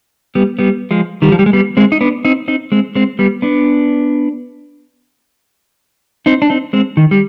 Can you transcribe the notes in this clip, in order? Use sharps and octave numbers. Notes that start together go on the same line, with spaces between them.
G3 B3
G3 B3
F3 G#3
D#3 G3
F3
G3
G#3
G3 B3
G#3 C4
D#4
B3 D4
C4 D#4
C4 D#4
G#3 C4
G#3 C4
G3 B3
B3 D4
C4 D#4
D4
C4 D#4
G#3 C4
D#3
G3